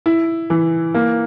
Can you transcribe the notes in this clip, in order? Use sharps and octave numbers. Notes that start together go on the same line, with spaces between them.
E4
E3
A#3